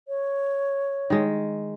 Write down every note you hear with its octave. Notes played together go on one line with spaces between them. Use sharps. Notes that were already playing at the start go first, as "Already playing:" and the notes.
C#5
D#3 G#3